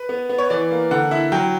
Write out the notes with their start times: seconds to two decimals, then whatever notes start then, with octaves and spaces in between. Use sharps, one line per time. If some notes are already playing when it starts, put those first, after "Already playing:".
Already playing: B4
0.09 B3
0.29 B3
0.38 C#5
0.50 E3 D5
0.71 A#3
0.91 D3 F#5
1.11 E4 E5
1.32 F#3 G5